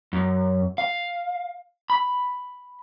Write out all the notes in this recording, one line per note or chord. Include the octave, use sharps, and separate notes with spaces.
F#2
F5
B5